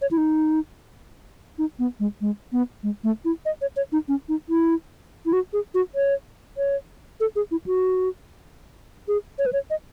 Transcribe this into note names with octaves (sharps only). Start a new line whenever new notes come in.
C#5
E4
D#4
D#4
B3
G#3
G#3
B3
G#3
A3
E4
D#5
C#5
C#5
D#4
C#4
D#4
E4
E4
F#4
G#4
F#4
C#5
C#5
A4
G#4
E4
F#4
G#4
C#5
B4
C#5
D#5